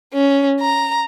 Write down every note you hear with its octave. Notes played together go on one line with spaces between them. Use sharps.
C#4
A#5